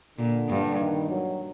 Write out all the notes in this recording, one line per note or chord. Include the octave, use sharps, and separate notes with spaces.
A#2 D3
G2
D#3
F#3